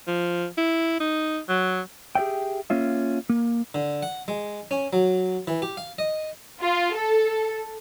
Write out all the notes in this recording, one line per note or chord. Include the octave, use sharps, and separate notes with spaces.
F3
E4
D#4
F#3
G4 G#4 D5 E5 G5
A#3 C#4 F4 E5
A#3
D3
F#5
G#3
C#4
F#3
E3
G4
F5
D#5
F4
A4